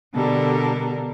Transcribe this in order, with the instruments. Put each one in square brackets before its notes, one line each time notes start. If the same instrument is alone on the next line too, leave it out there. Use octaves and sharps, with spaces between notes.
[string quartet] B2 D3 G3 A4 A#4